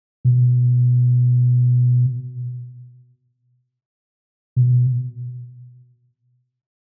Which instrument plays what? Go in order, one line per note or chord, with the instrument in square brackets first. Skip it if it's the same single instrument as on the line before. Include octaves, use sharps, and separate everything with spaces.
[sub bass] B2
B2